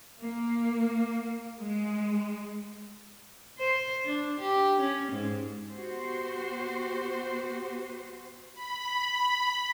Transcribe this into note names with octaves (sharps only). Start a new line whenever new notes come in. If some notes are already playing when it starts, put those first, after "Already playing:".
A#3
G#3
C5
D4
G4
C#4
G#2
B3 F#4 G4 C5
B5